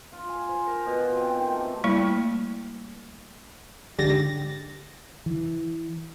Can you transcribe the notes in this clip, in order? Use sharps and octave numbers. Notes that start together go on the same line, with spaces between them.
F4
G#5
C5
A#4
B2
F4
C4
D#3
A3
C3
G3 A3 A#3 E4
C#2 G#2 D3 G4 A6 A#6
E3